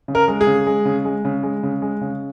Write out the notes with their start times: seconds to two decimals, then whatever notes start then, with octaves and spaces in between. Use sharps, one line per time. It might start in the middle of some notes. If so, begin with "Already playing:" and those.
0.08 C#3
0.15 A#4
0.28 G#3
0.41 G#4
0.47 C#3
0.67 G#3
0.85 C#3
1.05 G#3
1.25 C#3
1.43 G#3
1.63 C#3
1.82 G#3
2.01 C#3